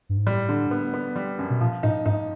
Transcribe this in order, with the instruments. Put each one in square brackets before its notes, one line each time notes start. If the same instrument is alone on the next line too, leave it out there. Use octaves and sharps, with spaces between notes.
[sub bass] G2
G#2
[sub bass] A2 [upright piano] G3
[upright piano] D3
B3
B3
G3
F#2
[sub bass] B2
[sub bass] A#2 [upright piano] F3
[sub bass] A2 [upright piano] D#4
[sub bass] G#2 [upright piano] D#4